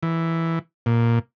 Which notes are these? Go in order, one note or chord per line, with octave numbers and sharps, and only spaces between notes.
E3
A#2